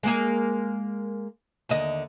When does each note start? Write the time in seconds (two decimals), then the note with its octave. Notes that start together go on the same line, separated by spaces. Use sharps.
0.03 G#3 A#3 G#4
1.69 D#2 D3 D#5